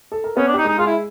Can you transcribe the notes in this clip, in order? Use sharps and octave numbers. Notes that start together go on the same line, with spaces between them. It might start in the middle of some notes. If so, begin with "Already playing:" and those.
A4
A#4
B3 C#4 B4
D4
D#4 G4
G#3 D#4 G#4
G#3 F4 G#4
E4